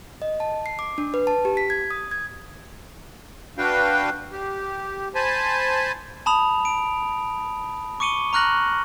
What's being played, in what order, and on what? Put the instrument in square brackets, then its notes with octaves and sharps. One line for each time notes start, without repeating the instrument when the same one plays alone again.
[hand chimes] D#5
A5
C7
D6
D4
B4
A5
G4
B6
G#6
D#6
G#6
[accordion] D4 F#4 B4 F5 G5
G4
C5 G#5 A5 B5
[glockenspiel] A5 B5 D#6 F7
D7
C#6 D6 C#7 D#7 G7
A#5 C#6 F6 F#6 A#6 F#7